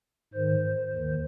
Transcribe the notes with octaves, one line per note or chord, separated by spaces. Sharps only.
G#2 D#3 C5
D#2 D#3